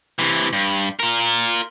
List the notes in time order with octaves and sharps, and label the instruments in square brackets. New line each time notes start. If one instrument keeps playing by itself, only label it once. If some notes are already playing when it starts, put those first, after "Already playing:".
[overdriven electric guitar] C3 E3
G2
F4 A#4